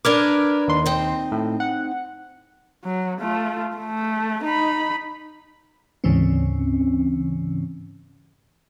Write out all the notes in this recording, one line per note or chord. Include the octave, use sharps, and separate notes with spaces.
D4 A#4 B4 D6 F6 G#6
D#2 C6
C4 D#4
A2
F#5
F#3
A3 F4
A3
D#4 B5
D2 G#2 C#3 E3 C4 C#4